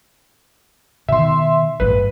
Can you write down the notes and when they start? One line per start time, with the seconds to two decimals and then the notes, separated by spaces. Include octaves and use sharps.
1.08 B2 D#3 E5 C6
1.80 A1 G2 B4